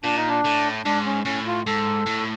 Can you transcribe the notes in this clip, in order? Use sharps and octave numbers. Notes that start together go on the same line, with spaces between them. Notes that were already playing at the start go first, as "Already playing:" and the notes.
A#2 D4
D#4
D4
A2
G#2 D4
C#4
A2 C#4
F4
G#2 A4
A2